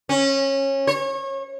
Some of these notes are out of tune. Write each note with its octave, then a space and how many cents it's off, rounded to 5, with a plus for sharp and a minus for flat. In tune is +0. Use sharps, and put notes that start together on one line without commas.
C#4 -20
C#5 -30